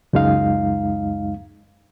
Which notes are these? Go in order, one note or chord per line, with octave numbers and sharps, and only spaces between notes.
C#2 F#2 G#3 D#4 F5